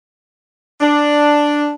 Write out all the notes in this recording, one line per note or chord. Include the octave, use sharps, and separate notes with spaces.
D4